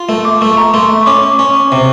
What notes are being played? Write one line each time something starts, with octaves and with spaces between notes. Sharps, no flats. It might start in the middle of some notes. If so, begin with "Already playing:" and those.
Already playing: F4
A3
D6
A3 C#6
A#5
A3 C6
C#6
C#4 D6
D6
C#4 C#6
C3